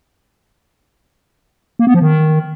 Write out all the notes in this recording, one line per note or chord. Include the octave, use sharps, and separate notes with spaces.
A#3
B3
F3
D#3